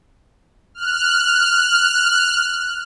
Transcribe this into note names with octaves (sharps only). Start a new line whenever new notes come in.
F6 F#6